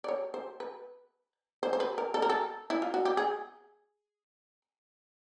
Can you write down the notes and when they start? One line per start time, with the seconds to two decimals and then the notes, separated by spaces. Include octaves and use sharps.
0.04 D5
0.08 C#5
0.34 C5
0.60 B4
1.63 C5
1.73 C5
1.80 B4
1.98 A#4
2.14 A4
2.22 A#4
2.30 A4
2.70 E4
2.82 F4
2.94 F#4
3.05 G4
3.17 G#4